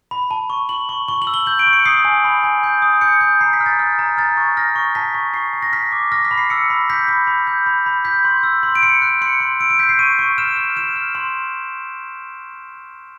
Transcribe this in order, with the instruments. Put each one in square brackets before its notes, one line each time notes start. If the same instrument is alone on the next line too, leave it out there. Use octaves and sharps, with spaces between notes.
[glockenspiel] B5
A5
C#6
C#6 F#7
C#6
C#6 G7
F#7
E6
G7
G6 F#7
D7
C#6
C#7
D#6 C7
G#5
B5
G#5
G6
D#6
G6 C#7
G6
A#5 C7
B6
F6
A6
F6
A#5
F6 A6
C#6
F6 A#6
C#6
A5 B6
C#6
C#6 C7
C#6
A#6
F6 B6
D6
F6 A#6
B6
B5
C7
E6 C#7
B5
G6 B6
B5
B5
G6
B5
B5
G6 B6
C6
E6
C6
D7
C6 C#7
F#6
C6 C#7
C6
E6 D7
D7
G6 B6
C7
C#6 D#7
C#6
F6 E7
F6
F6 E7
F6
C6